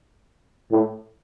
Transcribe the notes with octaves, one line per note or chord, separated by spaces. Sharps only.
A2